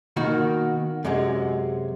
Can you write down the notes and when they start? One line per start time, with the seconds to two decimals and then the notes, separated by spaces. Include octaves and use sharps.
0.16 B2 D#3 A#3 F#4
1.04 F#2 C3 F#3 G#3